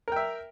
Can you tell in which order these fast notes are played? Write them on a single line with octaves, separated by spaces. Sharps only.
A#4 G5 E5